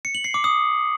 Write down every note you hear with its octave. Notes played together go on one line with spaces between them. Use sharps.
C#7
F#7
C7
D6
D#6